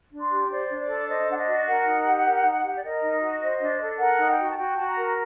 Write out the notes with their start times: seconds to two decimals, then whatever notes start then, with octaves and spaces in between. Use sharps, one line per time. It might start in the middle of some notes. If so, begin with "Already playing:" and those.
0.10 D4
0.20 C6
0.30 G4
0.49 C5 D5
0.69 D4
0.77 D5
0.87 A4
1.07 C5 D#5
1.27 D4 F#5
1.36 D#5
1.46 F#4
1.65 A#4 F#5
1.85 D#4
2.04 G4
2.24 A#4
2.43 D#4
2.62 G4
2.76 D5
2.82 A#4 D#5
3.01 D#4
3.21 F#4
3.40 C5
3.59 D4
3.79 A4
3.98 A#4 F#5
4.17 D#4
4.28 G5
4.38 F#4
4.49 A5
4.56 F#4 G5
4.76 F#4 A5
4.87 A#5
4.96 A#4